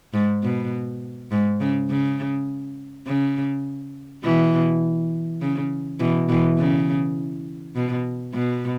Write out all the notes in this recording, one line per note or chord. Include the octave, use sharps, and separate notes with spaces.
G#2
B2
G#2
C#3
C#3
C#3
B2 E3
C#3
B2 E3
B2 E3
C#3
B2
B2